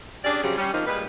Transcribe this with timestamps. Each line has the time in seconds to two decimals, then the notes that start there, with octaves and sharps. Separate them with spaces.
0.24 C#4 D4 G4 G#4 D5
0.43 C#3 F#3 G3 C4 G4 G#4
0.57 G3 C#4
0.73 D#3 F3 A#3 C4 D#4
0.87 A#2 G3 G#3 B4